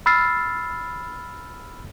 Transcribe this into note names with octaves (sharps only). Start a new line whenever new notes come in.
B5 E6 F6 A6 C7